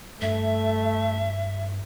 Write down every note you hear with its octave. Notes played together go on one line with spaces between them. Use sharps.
G2 A3 E5